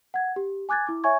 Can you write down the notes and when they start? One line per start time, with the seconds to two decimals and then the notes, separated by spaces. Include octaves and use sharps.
0.14 F#5 G#6
0.36 G4
0.69 G#5 D6 F#6 G#6 A6
0.87 E4 D6
1.04 C#5 E5 G#5 C#6 G#6